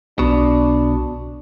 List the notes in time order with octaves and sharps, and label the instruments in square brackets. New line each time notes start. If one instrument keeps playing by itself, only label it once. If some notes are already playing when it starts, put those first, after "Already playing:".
[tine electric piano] B1 [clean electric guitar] B2 [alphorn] D4